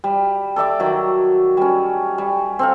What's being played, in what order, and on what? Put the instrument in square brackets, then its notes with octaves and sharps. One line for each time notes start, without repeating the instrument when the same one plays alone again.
[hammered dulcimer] G3
A4 D5 E5 D6
D#3 F#3
G3 C#4
G3
C4 A4 F5